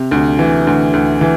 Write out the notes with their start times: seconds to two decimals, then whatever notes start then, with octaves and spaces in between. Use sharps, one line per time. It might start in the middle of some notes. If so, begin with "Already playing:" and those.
Already playing: C3
0.11 D2
0.39 E3
0.67 D2
0.93 D2
1.21 E3